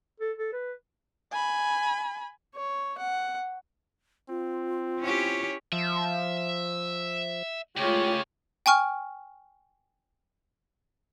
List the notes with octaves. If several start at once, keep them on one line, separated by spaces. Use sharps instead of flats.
A4
A4
B4
G#5 B5
C#5
F#5
C4 F4
C#4 E4 G4 C#5
F3 E5
C#3 G#3 A3 F4 G4 C#5
G5 G#5 C#6 F6